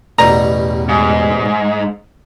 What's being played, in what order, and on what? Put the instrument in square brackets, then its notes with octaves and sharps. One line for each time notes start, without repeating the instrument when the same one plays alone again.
[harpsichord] A1 B2 G3 [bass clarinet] E2 [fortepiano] A#5
[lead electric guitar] G#2